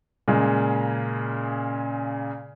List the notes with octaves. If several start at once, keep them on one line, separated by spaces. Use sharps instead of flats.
A#2 C#3 G#3